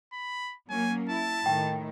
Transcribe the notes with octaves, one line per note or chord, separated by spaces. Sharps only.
B5
F#3 A#3 C#4 G#5
E4 A5
A2 D#3 G5